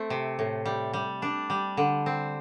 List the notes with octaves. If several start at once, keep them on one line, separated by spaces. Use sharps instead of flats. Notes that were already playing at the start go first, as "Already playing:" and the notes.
Already playing: A3 C4
C3
A2
G3
G3
D4
G3
D3
C4